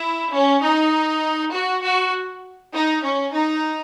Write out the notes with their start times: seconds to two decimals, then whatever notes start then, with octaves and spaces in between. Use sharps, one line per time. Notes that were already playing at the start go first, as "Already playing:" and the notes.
Already playing: E4
0.33 C#4
0.62 D#4
1.53 F#4
1.83 F#4
2.73 D#4
3.03 C#4
3.33 D#4